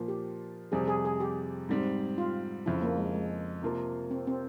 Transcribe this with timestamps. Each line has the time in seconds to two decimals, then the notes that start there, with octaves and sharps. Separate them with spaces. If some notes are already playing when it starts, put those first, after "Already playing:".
Already playing: A#2 F3 A#3
0.08 G4
0.72 F2 C3 G3 G#4
0.88 G#4
1.05 G#4
1.20 G4
1.69 G#2 G3 C4
2.18 F4
2.66 F2 C#3 F3 E4
2.82 A#3
2.97 G#3
3.14 G#3
3.62 C3 F3 A#3 F4 A#4
4.11 C4
4.27 C4